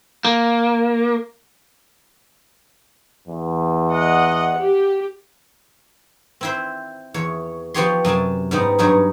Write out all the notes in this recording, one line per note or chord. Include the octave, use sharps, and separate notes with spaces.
A#3
E2
D#5 F#5
G4
C4 E4 C5
E2 C#5
F3 B3 F#4 G4 C#5 C6
F#2 C3 G#5 A5
G#2 G3 B3 D#4
G2 F#3 C#4 D#4